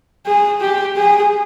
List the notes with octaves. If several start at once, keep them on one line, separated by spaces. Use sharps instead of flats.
G#4
G4
G#4